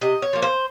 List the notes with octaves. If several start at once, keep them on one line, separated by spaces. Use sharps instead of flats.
C3 D#5
C#5
F3 A#3
C5